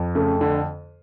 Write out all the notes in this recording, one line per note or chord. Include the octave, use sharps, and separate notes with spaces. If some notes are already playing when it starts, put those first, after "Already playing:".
Already playing: F2
C#3 A3
D3